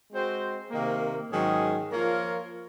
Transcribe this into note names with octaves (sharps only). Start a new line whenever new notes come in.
G#3 C4 F#4 C5
C3 D#3 A#3
G#2 D#3 F#3 C#4 G#4
F3 A#3 F4 A#4 C#5